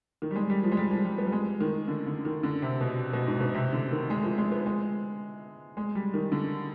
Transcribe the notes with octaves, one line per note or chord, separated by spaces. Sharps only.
D#3
G3
G#3
G3
F3
G#3
G3
F3
G3
B3
G3
G#3
D#3
D3
D3
D#3
D3
C3
B2
B2
G#2
B2
C3
D3
D#3
G#3
F3
G#3
B3
G#3
G#3
G3
D#3
D3